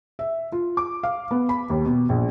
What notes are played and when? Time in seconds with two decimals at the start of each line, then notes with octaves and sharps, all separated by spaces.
0.19 E5
0.52 F4
0.77 D6
1.03 F5
1.31 B3
1.49 B5
1.70 D#2
1.85 B2
2.09 A#1